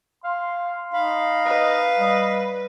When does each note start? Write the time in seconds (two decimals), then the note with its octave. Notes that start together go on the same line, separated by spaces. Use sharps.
0.24 F5 C6
0.93 D#4 F5 B5
1.45 B4 D#5
1.99 G3 D#5